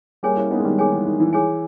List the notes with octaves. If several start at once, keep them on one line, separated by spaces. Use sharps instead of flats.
G3 A#3 G#4 C#5 G#5
C#4 E4
B3 D#4
G#3
D#3 G3
D#3 G3 G#4 C#5 G#5
E3
D#3
E3
G#4 C#5 G#5